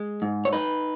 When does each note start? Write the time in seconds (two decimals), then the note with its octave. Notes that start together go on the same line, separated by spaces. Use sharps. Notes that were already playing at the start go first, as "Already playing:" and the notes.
Already playing: G#3
0.22 G#2
0.45 C#5
0.53 D#4 B4